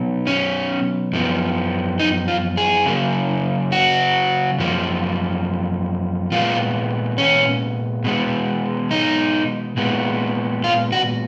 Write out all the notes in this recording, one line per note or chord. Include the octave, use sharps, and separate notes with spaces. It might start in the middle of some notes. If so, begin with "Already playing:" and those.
Already playing: B2 F#3 B3
C#4
F#2 F3 B3
D#4
F4
G#4
C#3 F#3 A#3
F#4
F#2 F3 A#3
A#2 G#3 B3 F4
C#4
B2 G#3 B3
D#4
A#2 G#3 B3
F4
F#4